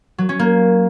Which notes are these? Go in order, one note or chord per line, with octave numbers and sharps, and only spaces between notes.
F#3
C#4
A#3